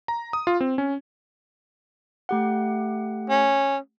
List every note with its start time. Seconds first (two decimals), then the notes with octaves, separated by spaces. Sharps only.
0.08 A#5
0.33 D#6
0.47 F4
0.61 C4
0.78 C#4
2.29 A3 G4 F#5
3.30 C#4